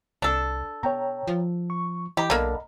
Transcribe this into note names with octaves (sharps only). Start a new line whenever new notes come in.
C2 D4 A4
B2 C#5 G5 A#5
F3
C#6
E3 G4 D#5 A#5 B5
B1 D3 A#3